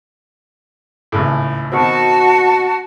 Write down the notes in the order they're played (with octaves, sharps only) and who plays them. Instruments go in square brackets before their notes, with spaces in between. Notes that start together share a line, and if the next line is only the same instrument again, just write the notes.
[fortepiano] G#1 C#2 A2
[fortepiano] B2 D#3 C4 [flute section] F#4 A5